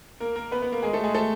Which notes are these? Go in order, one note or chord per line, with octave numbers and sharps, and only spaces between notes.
A#3 A#4
A#3 A#4
B3 B4
B3 B4
A#3 A#4
G#3 G#4
A3 A4
G#3 G#4
A3 A4